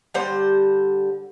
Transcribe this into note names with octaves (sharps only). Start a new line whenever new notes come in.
D3 G3 C5